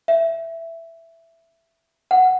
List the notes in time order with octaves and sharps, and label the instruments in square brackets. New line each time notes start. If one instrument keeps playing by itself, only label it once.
[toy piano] E5
F#5